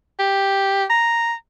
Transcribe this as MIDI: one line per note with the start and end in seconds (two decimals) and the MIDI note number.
0.19 0.84 67
0.90 1.34 82